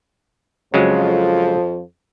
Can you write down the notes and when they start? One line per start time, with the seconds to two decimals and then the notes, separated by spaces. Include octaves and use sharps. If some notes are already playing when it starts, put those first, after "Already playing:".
0.74 F2 C#3 F3 F#3 G#3